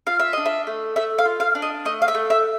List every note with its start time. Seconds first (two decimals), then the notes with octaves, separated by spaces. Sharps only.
0.07 F4 F5
0.20 E5
0.33 D4 D#5
0.46 E5
0.67 A3
0.96 A3 E5
1.18 F5
1.25 F4
1.40 F5
1.55 D4
1.62 D#5
1.85 A3 D#5
2.02 F5
2.08 E5
2.15 A3
2.30 E5